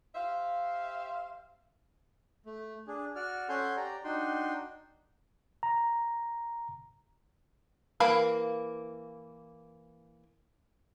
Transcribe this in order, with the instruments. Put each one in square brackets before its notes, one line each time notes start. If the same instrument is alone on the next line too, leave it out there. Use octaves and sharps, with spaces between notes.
[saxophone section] G4 C5 E5 F5
[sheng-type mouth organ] A3
D4 G#4
F#4 D5 F6
C#4 A4 F#5 G#5 C6 G6
G4 D5 A#5
D4 D#4 F#4 G5 C6
[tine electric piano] A#5
[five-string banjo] E3 A#3 F5 B5